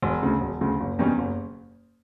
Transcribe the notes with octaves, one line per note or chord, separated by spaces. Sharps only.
E1
D2 C#3
E1
D2 C#3
F#1
E2 B2 G3 C#4
F#1